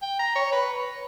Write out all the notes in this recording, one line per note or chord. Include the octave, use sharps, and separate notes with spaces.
G5
A#5
C#5
B4